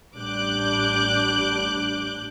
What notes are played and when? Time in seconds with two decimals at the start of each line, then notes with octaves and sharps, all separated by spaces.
0.17 A1 G3 D4 D6 F#6 G6